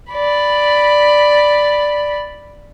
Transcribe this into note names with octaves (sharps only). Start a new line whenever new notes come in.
D5 B5